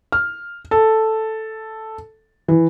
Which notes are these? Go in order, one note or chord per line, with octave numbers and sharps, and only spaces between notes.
F6
A4
E3